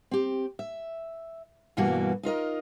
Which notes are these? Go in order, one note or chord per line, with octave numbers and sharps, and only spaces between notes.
C4 G4
E5
G2 B2 E3 G3 A#3 F#4
D#4 F4 A#4 D#5